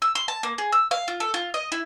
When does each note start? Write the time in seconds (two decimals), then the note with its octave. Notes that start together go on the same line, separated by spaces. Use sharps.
0.02 E6
0.15 C6
0.28 A5
0.43 A#3
0.58 G#4
0.72 E6
0.91 F5
1.08 F4
1.20 A4
1.34 F4
1.54 D#5
1.72 E4